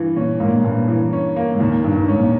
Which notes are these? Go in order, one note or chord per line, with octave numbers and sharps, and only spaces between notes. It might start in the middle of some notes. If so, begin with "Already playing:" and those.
Already playing: G2 E3
A#2 C#4
G#2 A#3
A#2
G#2
G2 A#2
E3
C#4
A#3
G#2
D#2 A#2
A#2
G2 D#3
G2
G#2 C#4
A#2